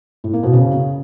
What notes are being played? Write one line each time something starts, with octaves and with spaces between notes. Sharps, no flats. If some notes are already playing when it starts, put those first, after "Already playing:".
A2
A#3
B2
C#3